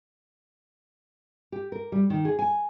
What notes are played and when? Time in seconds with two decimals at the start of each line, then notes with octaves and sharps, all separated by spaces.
1.52 G4
1.72 A#4
1.92 G3
2.10 D#3
2.25 G#4
2.39 G#5